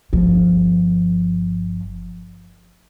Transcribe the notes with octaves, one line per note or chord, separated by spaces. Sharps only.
G1 F3